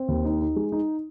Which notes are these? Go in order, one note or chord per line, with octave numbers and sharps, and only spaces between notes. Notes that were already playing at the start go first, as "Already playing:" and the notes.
Already playing: C4
D#2
D#4
D#4
G#3
D#4